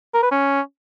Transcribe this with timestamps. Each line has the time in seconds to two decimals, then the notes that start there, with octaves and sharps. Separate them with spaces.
0.14 A#4
0.23 B4
0.32 C#4